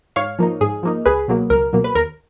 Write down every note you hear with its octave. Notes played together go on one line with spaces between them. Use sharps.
G#2 C#5 F5
F3 A#3 D#4
G#2 G#4
F3 A#3 D#4
C#2 G#4 B4
B2 F#3 A#3
C#2 A#4
B2 F#3 A#3
B4
D#2 A#4